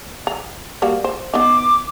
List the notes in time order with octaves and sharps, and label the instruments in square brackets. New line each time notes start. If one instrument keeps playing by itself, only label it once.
[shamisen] A#5
G3 A#3 F#4
C5
[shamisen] B3 D#4 [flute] D6